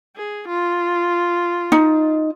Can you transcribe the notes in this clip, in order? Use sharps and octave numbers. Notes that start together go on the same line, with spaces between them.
G#4
F4
D#4